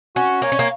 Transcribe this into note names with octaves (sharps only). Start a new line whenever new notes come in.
C#4 F#4
A#3 C#5 G#5
C#4
A#3